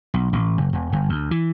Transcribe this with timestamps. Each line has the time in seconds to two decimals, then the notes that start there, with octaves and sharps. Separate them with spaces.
0.14 B1
0.33 A1
0.58 F#1
0.73 E1
0.92 G1
1.09 D2
1.31 E3